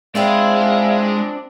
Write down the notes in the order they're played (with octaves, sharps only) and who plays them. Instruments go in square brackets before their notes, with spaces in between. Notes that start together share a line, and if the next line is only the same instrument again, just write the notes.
[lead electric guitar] G#3 [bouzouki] C4 E4 F4 [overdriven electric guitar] D4 [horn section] E5 F5